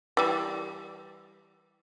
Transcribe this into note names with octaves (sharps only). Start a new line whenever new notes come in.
E3 G3